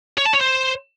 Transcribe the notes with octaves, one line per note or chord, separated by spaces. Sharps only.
C#5
A5
C#5
C5